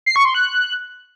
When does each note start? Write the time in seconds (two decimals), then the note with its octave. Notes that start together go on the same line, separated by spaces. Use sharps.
0.06 C7
0.16 C#6
0.25 C6
0.34 F#6